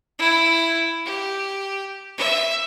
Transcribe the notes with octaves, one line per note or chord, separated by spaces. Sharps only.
E4
G4
E5